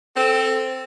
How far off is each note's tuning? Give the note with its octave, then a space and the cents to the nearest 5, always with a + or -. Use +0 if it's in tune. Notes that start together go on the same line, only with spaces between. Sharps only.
C4 -5 A4 +5